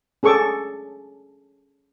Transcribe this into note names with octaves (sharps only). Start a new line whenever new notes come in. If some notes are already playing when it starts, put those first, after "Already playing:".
C#4 G#4 A4 C#6 D6